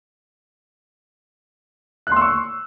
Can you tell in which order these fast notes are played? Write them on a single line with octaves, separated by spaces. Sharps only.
F#6 C6 E6 C#6